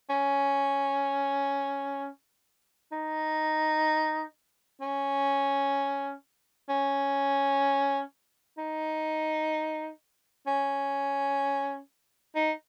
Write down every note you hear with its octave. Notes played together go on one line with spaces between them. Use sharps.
C#4
D#4
C#4
C#4
D#4
C#4
D#4